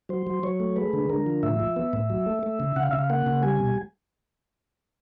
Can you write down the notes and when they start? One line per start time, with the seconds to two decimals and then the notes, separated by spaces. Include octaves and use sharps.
0.09 F#3 C5
0.27 F#3
0.43 F#3 C#5
0.60 A3
0.76 G#3 B4
0.93 D3
1.09 D3 A#4
1.26 F3
1.43 A2 E5
1.60 F3
1.76 B3
1.93 A2
2.10 F#3
2.26 A3
2.43 A3
2.60 C#3
2.76 C#3 F#5
2.83 F5
2.91 C#3 E5
2.99 F5
3.10 A#3 F#5
3.27 C#3
3.43 G3 G#5
3.60 B2